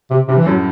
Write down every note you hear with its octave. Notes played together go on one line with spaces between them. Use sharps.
C3
G2 C3
E3
F#2 A2 F#3